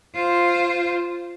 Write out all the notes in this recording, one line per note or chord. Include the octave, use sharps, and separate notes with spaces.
F4 C5